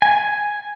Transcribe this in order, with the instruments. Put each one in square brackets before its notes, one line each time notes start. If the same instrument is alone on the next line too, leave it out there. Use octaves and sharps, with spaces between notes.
[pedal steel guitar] G#5